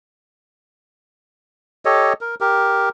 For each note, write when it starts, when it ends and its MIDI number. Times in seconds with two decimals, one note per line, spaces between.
1.85 2.13 67
1.85 2.13 69
1.85 2.13 73
1.85 2.13 75
2.21 2.35 70
2.41 2.89 67
2.41 2.89 70